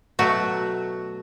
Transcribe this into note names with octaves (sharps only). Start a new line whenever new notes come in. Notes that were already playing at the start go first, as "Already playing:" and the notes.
B2 F#3 A3 F#4